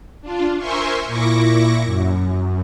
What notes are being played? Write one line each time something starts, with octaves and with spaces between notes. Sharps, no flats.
D4 F4
A#4 C5 E5 G#5 C6 C#6
A#2 E4 C#6 D6 A#6
F#2